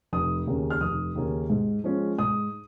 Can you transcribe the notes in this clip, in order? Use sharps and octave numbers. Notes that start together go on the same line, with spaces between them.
F1 D#6
D#2 C#3 A#3 C#4
F6
F1 D#6
D#2 C#3 A#3 C#4
G#2
F3 G#3 C#4
G#2 D#6